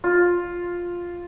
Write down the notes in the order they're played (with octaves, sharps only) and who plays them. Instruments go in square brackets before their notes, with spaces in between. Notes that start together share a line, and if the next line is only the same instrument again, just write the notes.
[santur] F4